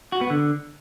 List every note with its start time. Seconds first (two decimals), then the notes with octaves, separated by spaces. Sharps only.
0.12 F#4
0.21 B3
0.30 D3